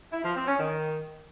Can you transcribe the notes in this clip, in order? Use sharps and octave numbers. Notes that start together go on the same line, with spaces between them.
E4
F3
C4
C#4
D#3